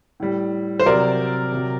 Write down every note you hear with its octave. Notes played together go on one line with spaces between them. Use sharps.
A2 G3
C5
C3 F#3 A#4 D5
C3 F#3